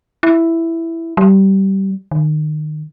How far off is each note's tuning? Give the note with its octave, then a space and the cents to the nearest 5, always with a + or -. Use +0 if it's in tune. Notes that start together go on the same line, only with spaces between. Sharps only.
E4 +5
G3 -20
D#3 -30